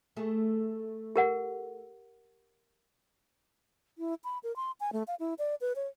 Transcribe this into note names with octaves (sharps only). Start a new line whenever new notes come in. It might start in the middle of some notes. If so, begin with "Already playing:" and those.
A3 G#4
G4 A#4 F#5
E4
B5
A#4
C6
G#5
A3
F5
E4
D5
B4
C#5